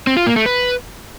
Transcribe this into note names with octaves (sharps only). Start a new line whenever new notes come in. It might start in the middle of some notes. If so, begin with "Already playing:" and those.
C4
F4
A#3
A3
B4